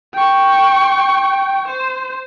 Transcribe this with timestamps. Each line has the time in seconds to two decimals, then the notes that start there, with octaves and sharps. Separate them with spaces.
0.13 G5 C#6
1.68 C5